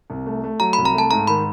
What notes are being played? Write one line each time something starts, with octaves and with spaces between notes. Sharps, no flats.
C2
A3
A3
F#3 A#5
B5
C2
A#5
A3 A5
G#2 A#5
D#3 B5